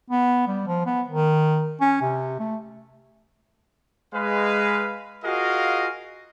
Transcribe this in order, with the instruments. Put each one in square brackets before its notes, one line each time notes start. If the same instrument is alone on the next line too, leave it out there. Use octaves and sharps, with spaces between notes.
[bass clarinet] B3
G3
F3
B3
D#3
C#4
C3
A3
[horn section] G#3 B4 F5
F4 F#4 G#4 A#4 D#5 F5